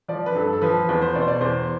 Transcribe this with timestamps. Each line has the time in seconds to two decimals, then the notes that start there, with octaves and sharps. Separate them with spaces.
0.08 F3 D5
0.26 B4
0.35 G2 A4
0.53 A4
0.61 F3 B4
0.89 E2 B4
1.02 C5
1.15 B2 D5
1.21 C5
1.28 D5
1.41 E2 C5